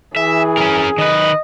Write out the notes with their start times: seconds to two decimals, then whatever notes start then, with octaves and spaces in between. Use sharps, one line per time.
0.16 E3 G#4 E5
0.57 C#4 A#4
0.98 D#3 B4 D#5